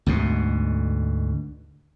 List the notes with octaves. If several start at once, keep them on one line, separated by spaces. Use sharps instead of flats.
D2 G#2 B2